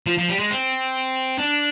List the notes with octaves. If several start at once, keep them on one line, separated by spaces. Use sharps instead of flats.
F3
F3
G3
G#3
C4
D4